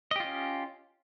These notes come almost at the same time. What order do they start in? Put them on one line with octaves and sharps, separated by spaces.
D#5 G4 F4 C#4